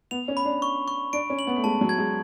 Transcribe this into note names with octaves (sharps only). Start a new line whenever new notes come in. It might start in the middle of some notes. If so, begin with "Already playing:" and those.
B3 F7
C#4
B5
D4
C#6
C#6
D4 D7
C#4
F#7
B3
A3
G#3 A5
F#3
G#6
G#3